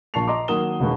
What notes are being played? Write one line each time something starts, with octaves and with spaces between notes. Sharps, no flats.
A#1 A#2 A5 C#6 C7 F7
D#5 A#5 C6 D6
D#3 F#3 A#3 D#6 E7 G7
E1 D#2 B2 G#3 B3 C#6